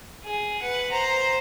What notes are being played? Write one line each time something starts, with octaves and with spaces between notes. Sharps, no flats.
G#4
B4 F#5
C5 A#5